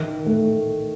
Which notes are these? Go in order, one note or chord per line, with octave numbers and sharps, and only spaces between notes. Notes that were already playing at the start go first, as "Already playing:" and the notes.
Already playing: D#3
A3